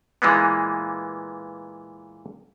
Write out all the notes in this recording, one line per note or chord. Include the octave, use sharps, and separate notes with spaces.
A#2 E3 G#3 A#3 B3